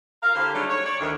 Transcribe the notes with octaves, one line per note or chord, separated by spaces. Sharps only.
A#4 F5
D3 E4 G4 C5
C#3 F#3 G3 A3 D4 D#4
C#5
C#5 D5
D2 D3 D#3